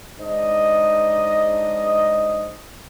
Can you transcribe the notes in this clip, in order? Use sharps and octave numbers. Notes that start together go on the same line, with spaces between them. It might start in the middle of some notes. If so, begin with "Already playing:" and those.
G#3 D4 D#4 C5 D#5